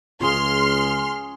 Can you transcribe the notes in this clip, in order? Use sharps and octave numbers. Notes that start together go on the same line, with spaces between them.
C#2 C#4 F4 G#4 C#5 C6 F6